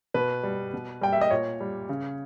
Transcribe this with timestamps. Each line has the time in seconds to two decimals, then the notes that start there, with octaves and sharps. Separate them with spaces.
0.14 B2 B4
0.43 G3
0.74 B2
1.01 G3 G5
1.13 E5
1.21 D#5
1.31 A#2 C#5
1.60 G3
1.89 C#3